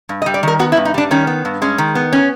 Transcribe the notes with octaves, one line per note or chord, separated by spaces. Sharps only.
G2
D#5
G3
D5
D#3 A#4
B3 F#4
E4
G2
D#4
G3 D4
D#3 C#4
B3
G2
G#3 C#4
D#3
B3
C#4